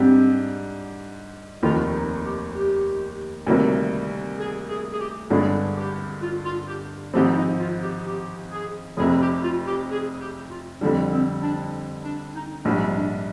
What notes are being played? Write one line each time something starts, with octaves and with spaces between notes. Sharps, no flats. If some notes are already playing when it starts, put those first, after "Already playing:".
Already playing: G#2 G3 C4 D4 G4
F1 D#2 D#3 F4
D#4
G4
G4
D2 C3 D#3 G3 A#3
G#4
G#4
G#4
G4
G1 G2 D3 G#3 D4 G#4
G4
F4
F4
G4
G#1 G#2 F3 C4 G4
D#4
F4
G4
G4
G#4
F1 F2 C3 G#4
G4
F4
G4
G#4
G4
F4
F2 D3 G3 D4
C4
D4
D4
D#4
A#1 G#2 G3 D4
D4